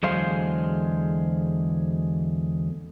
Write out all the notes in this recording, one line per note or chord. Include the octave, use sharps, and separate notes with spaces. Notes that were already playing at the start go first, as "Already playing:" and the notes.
E2 D3 F#3 G#3 C5 F5